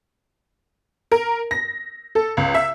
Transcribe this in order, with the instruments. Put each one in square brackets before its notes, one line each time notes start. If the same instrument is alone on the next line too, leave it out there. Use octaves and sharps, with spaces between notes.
[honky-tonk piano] A#4
A#6
A4
C#2
E5